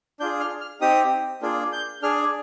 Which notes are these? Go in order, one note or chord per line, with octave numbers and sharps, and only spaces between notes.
D4 F4 G#4 G6
F6
F6
C4 D#4 G4 D#6
A#3 D4 F4 G#4
G6
D4 G#4 F6